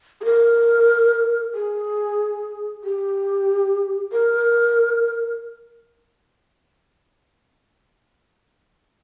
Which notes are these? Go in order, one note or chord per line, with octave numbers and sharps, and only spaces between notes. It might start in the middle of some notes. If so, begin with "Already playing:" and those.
G#4
A#4
G#4
G4
A#4